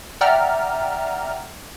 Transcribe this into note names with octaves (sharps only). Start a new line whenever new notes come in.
D5 E5 F#5 G5 A#5 F6